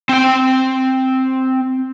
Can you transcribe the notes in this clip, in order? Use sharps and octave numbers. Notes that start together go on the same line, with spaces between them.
C4 G5